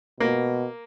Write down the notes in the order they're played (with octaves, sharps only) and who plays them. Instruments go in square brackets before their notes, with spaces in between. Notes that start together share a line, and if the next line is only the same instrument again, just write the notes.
[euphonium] B2 [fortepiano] A#3